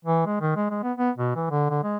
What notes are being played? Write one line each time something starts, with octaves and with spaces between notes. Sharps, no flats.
E3
G#3
D#3
G#3
G#3
B3
B3
B2
E3
D3
D3
G#3